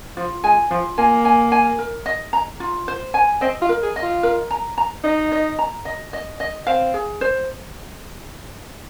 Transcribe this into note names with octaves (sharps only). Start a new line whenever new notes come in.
F3 F4
G#3 G#5
F3 F4
A#3 G#5
G#5
G#5
A#4
D#5
A#5
F4
C5
G#5
C4 D#5
F4
A#4
G#4
D#5
F4
A#4
A#5
A#5
D#4 D#5
D#5
A#5
D#5
D#5
D#5
C4 F5
G#4
C5